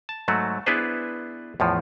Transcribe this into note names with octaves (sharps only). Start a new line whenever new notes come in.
A5
G#2 F#3 A3 F#4
B3 D4 E4 G#4 B4 C5
E2 A2 F3